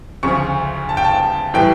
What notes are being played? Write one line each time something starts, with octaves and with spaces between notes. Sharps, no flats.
D2 C#3 F3 C#6
A5
G5
A5
A2 E3 G3 G5